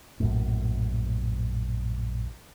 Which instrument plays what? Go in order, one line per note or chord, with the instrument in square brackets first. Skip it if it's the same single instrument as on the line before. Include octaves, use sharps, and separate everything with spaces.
[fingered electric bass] A#1 F#2 A2